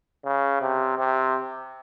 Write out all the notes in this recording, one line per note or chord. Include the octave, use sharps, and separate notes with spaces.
C#3
C3
C3